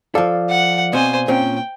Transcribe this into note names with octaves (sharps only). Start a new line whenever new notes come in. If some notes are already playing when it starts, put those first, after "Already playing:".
F3 A4 D5 F5
F#5
B2 C4 C5 G#5
A#2 C4 C#4 G5